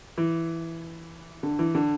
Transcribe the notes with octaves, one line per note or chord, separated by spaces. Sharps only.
E3
D3
E3
D3